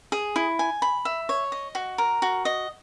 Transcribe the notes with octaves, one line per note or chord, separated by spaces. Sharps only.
G#4
E4
G#5
B5
E5
C#5
D#5
F#4
A#4
F#4
D#5